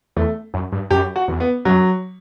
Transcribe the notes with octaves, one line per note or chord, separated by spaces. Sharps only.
E2 A3
F#2
G2
F#2 G4
F#4
E2
B3
F#2 F#3